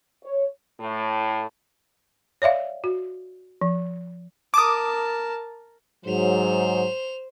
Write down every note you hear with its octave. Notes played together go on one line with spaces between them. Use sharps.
C#5
A2
C#5 D5 E5 F5
F#4
F3
A#4 A5 D6 D#6
G#2 F#3 C5 F7